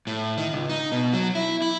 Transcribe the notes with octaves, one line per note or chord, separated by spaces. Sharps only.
A2
D#3
C#2
D#4
B2
F#3
E4
E4